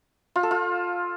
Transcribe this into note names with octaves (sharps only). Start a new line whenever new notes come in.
F4
A4
F4